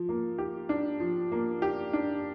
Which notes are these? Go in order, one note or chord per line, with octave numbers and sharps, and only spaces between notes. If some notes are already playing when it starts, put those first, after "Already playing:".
Already playing: F3
A#3
G4
D4
F3
A#3
G4
D4